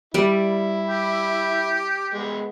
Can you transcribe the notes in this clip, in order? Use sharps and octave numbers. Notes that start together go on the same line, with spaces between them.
G3 E4 D5
G4
G#3 B3